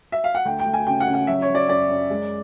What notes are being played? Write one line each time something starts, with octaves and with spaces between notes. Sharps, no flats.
E5
F5
F#5
D2 G5
G5
D2
G#5
C#3 G5
F#5
C#3
F#5
F#3 E5
C#5
F#3
D5
F#2 D5
F#2
G#3